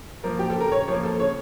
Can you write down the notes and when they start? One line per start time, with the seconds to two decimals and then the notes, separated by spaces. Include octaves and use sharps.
0.24 F3 A#3 A#4
0.39 G4
0.50 A4
0.56 C#3 A#4
0.72 C#5
0.88 F3 A#3 C#5
1.03 A4
1.19 C#3 C#5